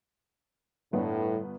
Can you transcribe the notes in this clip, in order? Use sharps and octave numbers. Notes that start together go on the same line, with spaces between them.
G1 A2 B3 D4